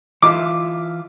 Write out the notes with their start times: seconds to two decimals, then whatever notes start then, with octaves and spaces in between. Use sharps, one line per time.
0.22 E3 F4 E5 D6